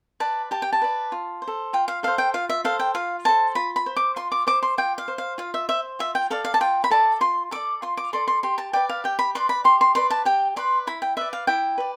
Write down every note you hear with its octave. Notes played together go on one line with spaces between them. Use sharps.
B4 D5 A5
G4 A5
G5
A5
B4 D5
F4
C5
A4
F4 G5
F5
A4 C5 F5
G5
F4 F5
E5
A4 C5 F5
G5
F4 F5
A4 C5 A5
F4 B5
B5
C5
D6
F4 C6
D6
C5 D6
C6
F4 G5
F5
C5
F5
F4 F5
E5
C5 E5
F4 E5
G5
A4 D5 F5
F5
A5
F4 G5
B5
A4 D5 A5
F4 C6
A4 D5 D6
F4 C6
D6
A4 D5 C6
C6
G4 C6
A5
B4 D5 G5
F5
G4 G5
B5
B4 D5 C6
B5
G4 C6
C6
B4 D5 C6
A5
G4 G5
B4 D5 C6
E4 B5
G5
B4 D5 E5
F5
E4 G5
B4 D5